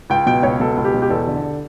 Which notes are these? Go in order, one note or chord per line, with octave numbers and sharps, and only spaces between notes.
C#2 G5
B2 G5
C#2 C#5
B2 A4
C#2
G4
B2
G4
E2 A4
D3